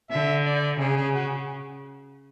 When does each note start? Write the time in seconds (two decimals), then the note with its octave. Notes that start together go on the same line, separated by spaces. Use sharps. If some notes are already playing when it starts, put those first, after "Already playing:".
0.11 D3 E5
0.46 D5
0.80 C#3 G#4
0.96 G#4
1.14 F#4